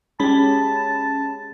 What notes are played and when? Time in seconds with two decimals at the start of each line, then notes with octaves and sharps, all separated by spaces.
0.20 G#3 C#4 G4 A5 B5